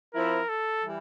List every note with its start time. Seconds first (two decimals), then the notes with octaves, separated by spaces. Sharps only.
0.14 F3 C4 E4 A#4
0.49 A4
0.84 E3 G3